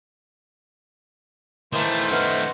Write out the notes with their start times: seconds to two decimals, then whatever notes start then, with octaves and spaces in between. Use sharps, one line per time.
1.73 D#3 E3 A3 A#3 C5
2.11 C#4 B4 D#5 F#5 F6